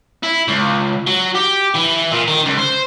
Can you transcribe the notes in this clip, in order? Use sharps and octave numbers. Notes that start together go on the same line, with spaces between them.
E4
C#2
F#3
G4
E3
A#2
D#3
C#2
C5